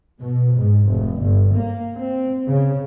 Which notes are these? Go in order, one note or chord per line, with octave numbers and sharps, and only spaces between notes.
B2
G#2
F1
G1
A#3
C4
C#3